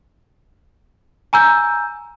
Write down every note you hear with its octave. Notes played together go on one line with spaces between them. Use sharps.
G#5 A#5 E6 G6